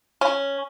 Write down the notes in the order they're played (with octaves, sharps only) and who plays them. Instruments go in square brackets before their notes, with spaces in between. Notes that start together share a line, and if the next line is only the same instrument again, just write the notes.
[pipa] C#4